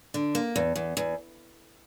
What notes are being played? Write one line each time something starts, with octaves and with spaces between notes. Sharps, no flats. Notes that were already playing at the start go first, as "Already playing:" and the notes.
D3
A#3
E2
E2
E2